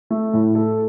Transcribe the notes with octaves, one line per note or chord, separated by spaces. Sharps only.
A3
A2
A4